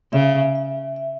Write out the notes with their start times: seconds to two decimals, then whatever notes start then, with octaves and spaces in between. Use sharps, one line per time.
0.13 C#3 E5
0.55 E5
0.96 E5